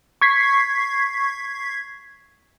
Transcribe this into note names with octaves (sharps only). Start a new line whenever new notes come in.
C#6 G#6 B6 C7